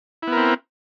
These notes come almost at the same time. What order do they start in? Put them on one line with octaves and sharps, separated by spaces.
E4 B3 A#4 C4